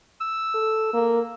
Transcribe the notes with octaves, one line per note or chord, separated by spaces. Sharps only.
E6
A4
A#3